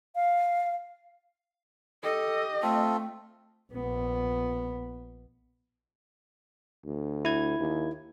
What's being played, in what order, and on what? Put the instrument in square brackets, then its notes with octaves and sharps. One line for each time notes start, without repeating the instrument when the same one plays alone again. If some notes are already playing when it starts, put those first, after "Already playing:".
[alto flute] F5
[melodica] G4 [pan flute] A4 [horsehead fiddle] D#5
[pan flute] A3 [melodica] C4 F4 A4
[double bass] A#1 B3
[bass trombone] D2
[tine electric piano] E4 G#6
[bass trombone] D#2